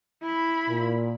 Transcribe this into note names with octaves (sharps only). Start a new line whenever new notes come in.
E4 B5
A#2